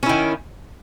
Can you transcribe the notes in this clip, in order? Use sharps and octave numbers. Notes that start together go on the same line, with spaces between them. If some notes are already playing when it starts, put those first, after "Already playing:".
D#3 C#4 E4